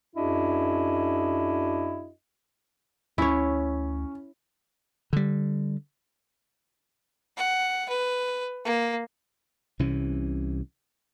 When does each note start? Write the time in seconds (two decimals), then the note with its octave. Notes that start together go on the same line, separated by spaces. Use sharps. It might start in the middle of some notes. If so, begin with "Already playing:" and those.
0.16 F#2 D4 E4 F#4 G#4 D#5
3.18 D2 C#4 E4 C#5
5.13 D3 G3
7.37 F#5
7.89 B4
8.65 A#3
9.79 C2 C3 E3 C#4